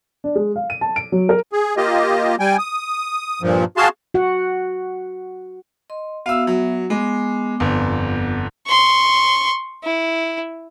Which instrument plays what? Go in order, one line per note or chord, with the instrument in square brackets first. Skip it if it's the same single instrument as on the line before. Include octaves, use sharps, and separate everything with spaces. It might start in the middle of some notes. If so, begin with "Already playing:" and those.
[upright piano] D4
G#3
F5
D#7
A5
D7
F#3
A#4
[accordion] G#4
A#3 F4 G4 D#5
G3 G5 G#5
D#6
G2 A#2 F3
F#4 G#4 F5 A5 C6
[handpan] F#4 F#5
[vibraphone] D#5 C6
[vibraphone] B3 F#4 E5 [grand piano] F5 E6
[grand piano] F#3
[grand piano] G#3 [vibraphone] B3 D6
[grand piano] G1 F2
[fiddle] C6 C#6
E4